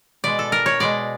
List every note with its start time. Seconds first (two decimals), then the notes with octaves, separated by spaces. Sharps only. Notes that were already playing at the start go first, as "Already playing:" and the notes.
0.24 B2 G#3 D5
0.39 A4
0.52 A#4
0.66 C#5
0.80 B2 G#3 D5